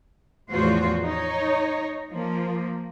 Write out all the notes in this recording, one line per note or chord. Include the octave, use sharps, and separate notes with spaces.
E2 A2 F3 F4 F#4 C5
D#4 C#5
F3 A#3